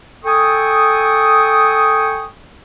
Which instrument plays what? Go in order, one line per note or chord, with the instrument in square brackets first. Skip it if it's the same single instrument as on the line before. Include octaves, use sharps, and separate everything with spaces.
[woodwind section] A4 G5 G#5 C#6 D#6